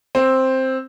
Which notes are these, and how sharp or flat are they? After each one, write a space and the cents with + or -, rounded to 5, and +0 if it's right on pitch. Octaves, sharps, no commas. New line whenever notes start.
C4 +5